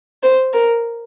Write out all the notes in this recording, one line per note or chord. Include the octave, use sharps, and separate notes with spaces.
C5
A#4